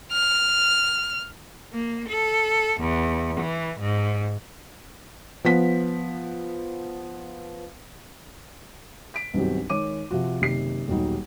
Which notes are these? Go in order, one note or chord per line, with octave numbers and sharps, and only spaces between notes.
F6
A#3
A4
E2
E3
G#2
F3 B3 B6
B6 D7
B1 G2 D#3 F#3 C4 G4
D#3 G#3 C#5 D6 D#7
C3 F3 F#4
F#1 C3 D#3 G4 C7
D#1 B1 F#3 G3 D#4